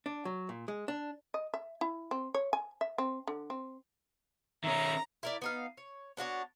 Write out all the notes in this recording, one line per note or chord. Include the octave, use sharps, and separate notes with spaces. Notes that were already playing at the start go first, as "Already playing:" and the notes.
D4
F#3
A#2
G#3
D4
D#5
E5
E4
C4
C#5
G#5
E5
C4
D3
C4
D#3 C#4 E5 A#5
E4 A#4 D5
B3 D#4 F5
C#5
B3 D4 F#4 C#5